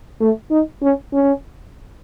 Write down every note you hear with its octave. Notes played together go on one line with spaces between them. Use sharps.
A3
D#4
C#4
C#4